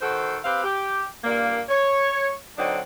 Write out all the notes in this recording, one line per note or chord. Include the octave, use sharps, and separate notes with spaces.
D#3 F#4 A4 C5
C4 G4 B4 F5
G4
G2 A#2 A#3
C#5
D3 F#3 C4 D4 D#4